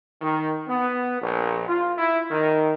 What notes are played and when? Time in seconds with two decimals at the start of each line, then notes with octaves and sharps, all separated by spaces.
0.21 D#3
0.67 B3
1.21 A#1
1.67 F4
1.98 E4
2.31 D#3